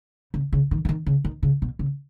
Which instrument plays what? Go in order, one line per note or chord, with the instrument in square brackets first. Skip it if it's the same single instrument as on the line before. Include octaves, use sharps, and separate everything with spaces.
[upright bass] C#3
C#3
D#3
C#3
D#3
C#3
D#3
C#3
B2
C#3